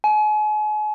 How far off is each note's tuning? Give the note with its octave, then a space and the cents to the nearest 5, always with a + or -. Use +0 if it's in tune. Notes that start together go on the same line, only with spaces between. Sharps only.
G#5 +40